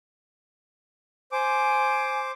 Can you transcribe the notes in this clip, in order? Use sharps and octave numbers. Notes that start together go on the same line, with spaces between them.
C5 G#5 D6